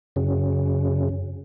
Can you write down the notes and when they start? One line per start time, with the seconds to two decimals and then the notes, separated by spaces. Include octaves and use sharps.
0.16 F#2 C#3